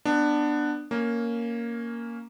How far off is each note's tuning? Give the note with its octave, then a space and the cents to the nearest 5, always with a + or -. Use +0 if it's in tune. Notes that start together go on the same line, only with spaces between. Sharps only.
B3 +0 D4 +15
A#3 +0 C#4 +10